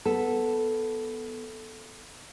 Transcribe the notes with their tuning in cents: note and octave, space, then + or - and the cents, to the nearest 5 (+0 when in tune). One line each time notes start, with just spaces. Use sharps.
B3 +0 A4 +0